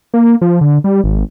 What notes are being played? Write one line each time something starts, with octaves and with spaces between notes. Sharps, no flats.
A#3
F3
D3
G3
G#1